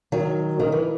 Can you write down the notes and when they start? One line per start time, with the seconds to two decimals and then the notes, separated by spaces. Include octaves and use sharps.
0.12 D#3 F#3
0.59 D#3
0.72 E3